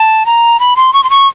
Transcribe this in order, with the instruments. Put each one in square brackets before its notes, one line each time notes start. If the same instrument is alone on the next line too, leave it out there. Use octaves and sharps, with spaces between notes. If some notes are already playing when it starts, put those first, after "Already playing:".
Already playing: [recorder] A5
A#5
B5
C6
C#6
C6
C#6